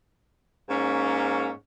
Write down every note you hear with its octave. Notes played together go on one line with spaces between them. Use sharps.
G#2 A#3 C#4